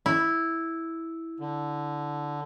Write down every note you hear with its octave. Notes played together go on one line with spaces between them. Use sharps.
E4
D3